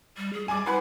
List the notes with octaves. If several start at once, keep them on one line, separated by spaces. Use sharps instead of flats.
G3
G#4
G3 G#5 D6
E4 B4 F#5 C6